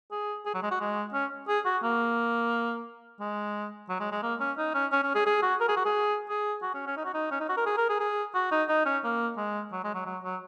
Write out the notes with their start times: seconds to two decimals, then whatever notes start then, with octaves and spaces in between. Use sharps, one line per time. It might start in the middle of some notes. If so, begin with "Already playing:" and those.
0.12 G#4
0.46 G#4
0.54 F#3
0.63 G#3
0.71 F#4
0.80 G#3
1.13 C#4
1.48 G#4
1.65 F#4
1.83 A#3
3.20 G#3
3.89 F#3
4.00 G#3
4.12 G#3
4.23 A#3
4.40 C#4
4.58 D#4
4.74 C#4
4.92 C#4
5.03 C#4
5.15 G#4
5.26 G#4
5.43 F#4
5.60 A#4
5.69 G#4
5.76 F#4
5.85 G#4
6.29 G#4
6.63 F#4
6.74 C#4
6.87 C#4
6.97 D#4
7.05 F#4
7.14 D#4
7.31 C#4
7.41 D#4
7.49 F#4
7.57 A#4
7.66 G#4
7.78 A#4
7.89 G#4
8.00 G#4
8.35 F#4
8.52 D#4
8.69 D#4
8.86 C#4
9.04 A#3
9.37 G#3
9.72 F#3
9.84 G#3
9.94 F#3
10.06 F#3
10.24 F#3